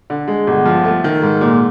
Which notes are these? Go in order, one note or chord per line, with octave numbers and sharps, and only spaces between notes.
D3
G#3
G1
F3
A3
D#3
G#2
A#2